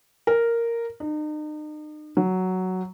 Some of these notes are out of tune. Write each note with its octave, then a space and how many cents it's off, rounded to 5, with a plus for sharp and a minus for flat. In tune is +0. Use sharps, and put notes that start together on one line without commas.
A#4 -5
D#4 -40
F#3 +5